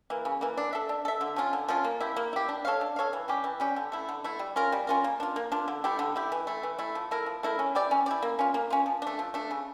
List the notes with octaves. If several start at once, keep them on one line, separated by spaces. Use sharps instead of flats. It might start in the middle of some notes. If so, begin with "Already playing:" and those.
E3 A#3
C#3
E3 A#3
D4
A4 E5
D4
A4 E5
D3
F3 C#4 F4
D3
F3 C#4 F4
A#3
E4 G4
A#3
E4 G4
D4
A4 C#5 F5
D4
A4 C#5 F5
E3
G3 C#4 G4
E3
G3 C#4 G4
D3
A3 E4
D3
A3 E4
G3
C#4 F4 A#4
G3
C#4 F4 A#4
A#3
D4 F4
A#3
D4 F4
D3
A3 E4 G4
D3
A3 E4 G4
E3
A3 E4
E3
A3 E4
F3
A3 E4 A#4
F3
A3 E4 A#4
C#4
E4 G4 D5
C#4
E4 G4 D5
A#3
C#4 F4
A#3
C#4 F4
F3
A3 D4
F3
A3 D4
C#3